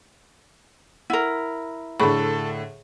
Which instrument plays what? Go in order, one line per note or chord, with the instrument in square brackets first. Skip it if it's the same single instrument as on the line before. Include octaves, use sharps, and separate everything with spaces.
[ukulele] E4 A#4 [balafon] F#5
[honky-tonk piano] A2 D3 [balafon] G#4 B5 C#6 [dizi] A4